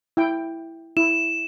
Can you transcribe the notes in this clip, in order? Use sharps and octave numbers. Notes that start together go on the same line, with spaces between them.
E4 G5
E4 E7